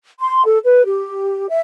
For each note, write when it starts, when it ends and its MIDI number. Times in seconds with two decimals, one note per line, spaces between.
0.20 0.42 84
0.45 0.58 69
0.65 0.82 71
0.86 1.47 67
1.49 1.59 76